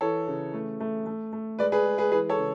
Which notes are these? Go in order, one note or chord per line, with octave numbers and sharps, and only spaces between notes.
E3 A4 C#5
C#3
A3
A3
A3
A3
G#3 B4 D5
G#4 B4
G#3
G#4 B4
E3 G#4 B4
A4 C#5
C#3